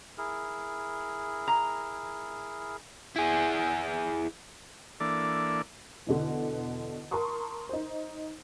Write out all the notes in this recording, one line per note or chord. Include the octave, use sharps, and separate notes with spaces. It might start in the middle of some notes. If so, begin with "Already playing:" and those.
E4 G#4 A#4
A#5
E4 G#4
E3 A#3 D4 A4 D5
E2 B2 D3
A#4 A5 C6 C#6 D#6
D#4 C5